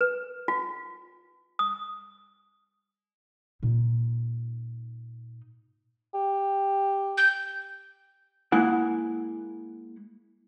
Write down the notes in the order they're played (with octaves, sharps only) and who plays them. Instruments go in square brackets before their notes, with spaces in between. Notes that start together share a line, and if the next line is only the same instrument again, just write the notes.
[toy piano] B4
F4
D#6
[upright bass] A#2 D#4
[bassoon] G4
[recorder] G6
[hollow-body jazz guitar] G#3 A#3 E4 F#5